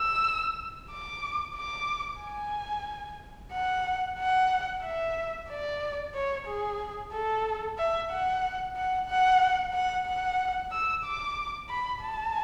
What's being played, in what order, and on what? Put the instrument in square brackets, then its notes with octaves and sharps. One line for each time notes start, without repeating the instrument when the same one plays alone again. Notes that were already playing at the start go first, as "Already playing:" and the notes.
Already playing: [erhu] E6
D6
D6
G#5
F#5
F#5
E5
D5
C#5
G#4
A4
E5
F#5
F#5
F#5
F#5
F#5
E6
D6
B5
A5